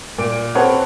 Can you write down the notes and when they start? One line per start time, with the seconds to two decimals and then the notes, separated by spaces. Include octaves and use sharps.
0.18 A#2 D7
0.55 C4 G#4 B4 C#5 F#5 A5